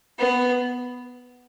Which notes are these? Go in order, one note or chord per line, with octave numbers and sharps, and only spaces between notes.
B3